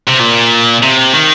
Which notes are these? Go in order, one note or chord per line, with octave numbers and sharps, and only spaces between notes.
C3
A#2
C3
D#3